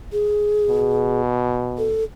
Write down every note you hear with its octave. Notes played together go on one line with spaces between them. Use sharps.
G#4
B2
A4